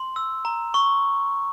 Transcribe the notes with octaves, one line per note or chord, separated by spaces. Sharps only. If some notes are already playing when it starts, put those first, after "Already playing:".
Already playing: C6
E6
A#5
C#6